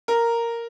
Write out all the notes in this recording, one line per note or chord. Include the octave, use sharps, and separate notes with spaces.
A#4